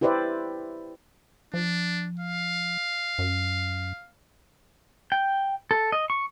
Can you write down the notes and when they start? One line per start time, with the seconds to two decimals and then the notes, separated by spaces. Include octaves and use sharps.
0.01 E4 G4 B4 C5 D5 E5
1.54 F3 D4
2.19 F5
3.19 F#2
5.12 G5
5.71 A4
5.92 D#5
6.10 C#6